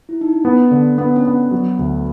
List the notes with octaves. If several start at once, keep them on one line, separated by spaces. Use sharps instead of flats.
E4
D#4
D4
B3 C#4
D3 D4
B3 D4
C#4
B3
F#3
D2